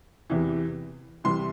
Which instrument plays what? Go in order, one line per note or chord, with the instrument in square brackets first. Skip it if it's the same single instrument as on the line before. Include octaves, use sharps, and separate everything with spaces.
[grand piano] E2 C3 E3
C2 C3 E3 C6